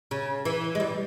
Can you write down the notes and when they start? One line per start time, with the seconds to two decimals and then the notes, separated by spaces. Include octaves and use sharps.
0.11 C#3
0.45 E3
0.75 G#3
0.80 G3